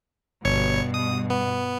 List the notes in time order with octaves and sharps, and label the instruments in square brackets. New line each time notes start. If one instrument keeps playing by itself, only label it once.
[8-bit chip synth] G1 C#5 C#6 [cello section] G2 B2
[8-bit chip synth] D#6
B3